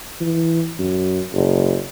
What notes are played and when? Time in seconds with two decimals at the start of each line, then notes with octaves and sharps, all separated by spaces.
0.21 E3
0.79 F#2
1.33 F#1